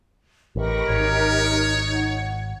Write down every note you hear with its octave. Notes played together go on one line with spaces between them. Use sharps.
A1 G4 A#4 D#5 B5 C#6 A#6
G#1 D#4 C#5
F#5